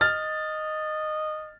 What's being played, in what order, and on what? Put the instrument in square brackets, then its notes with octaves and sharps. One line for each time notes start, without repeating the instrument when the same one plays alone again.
[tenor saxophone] D#5 [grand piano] F6 A6